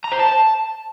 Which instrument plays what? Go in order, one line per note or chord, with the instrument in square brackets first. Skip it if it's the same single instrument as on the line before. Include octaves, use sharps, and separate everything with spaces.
[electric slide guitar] A#5
C5
A5